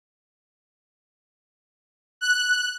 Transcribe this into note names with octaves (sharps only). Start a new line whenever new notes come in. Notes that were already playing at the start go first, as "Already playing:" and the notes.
F#6